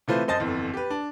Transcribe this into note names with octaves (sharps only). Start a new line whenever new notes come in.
C3 E3 A3 F4 B4 C5
F#2 C5 D#5 A5 A6
G1 F2 E3
G4 B4
D4